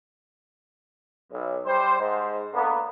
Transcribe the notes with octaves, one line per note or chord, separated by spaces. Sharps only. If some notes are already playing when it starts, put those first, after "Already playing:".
B1
G3 C5
G#2
D3 A#3 B3